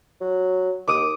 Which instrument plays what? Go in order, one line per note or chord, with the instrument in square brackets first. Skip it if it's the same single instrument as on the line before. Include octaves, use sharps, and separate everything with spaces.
[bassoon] F#3
[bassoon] D#2 [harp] D6 D#6